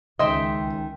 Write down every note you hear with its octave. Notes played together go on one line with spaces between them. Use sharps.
C#2 D#3 G#3 D#5 E5 G5 C6